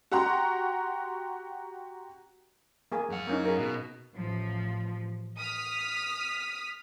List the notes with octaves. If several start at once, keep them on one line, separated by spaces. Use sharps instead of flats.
F#4 G4 F#5 A#5 C6
A#3 G#4 G#5
F#2 F#5
A#3 C#4 D#4
G#4 A#4
B2
A1 F3
D#6 F6 B6